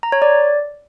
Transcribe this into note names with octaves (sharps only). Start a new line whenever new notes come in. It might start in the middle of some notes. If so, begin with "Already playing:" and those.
A#5
C#5
D5